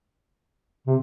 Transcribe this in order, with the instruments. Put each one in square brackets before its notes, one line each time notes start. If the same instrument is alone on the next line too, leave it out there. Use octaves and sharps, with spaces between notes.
[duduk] C3